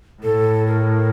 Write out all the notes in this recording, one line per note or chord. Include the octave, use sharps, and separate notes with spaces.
A2 A4
A#4